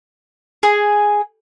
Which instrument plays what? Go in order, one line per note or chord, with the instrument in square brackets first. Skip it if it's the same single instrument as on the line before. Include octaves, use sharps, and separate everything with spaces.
[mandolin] G#4